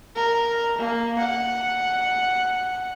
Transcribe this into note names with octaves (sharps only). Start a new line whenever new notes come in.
A#4
A#3
F#5